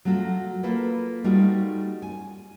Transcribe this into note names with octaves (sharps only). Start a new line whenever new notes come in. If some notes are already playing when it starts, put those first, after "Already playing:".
F#3 A3 F4 F#4 A4
A#3 F4 A4 B4
G3 A3 D#4 F4 F#4
G#5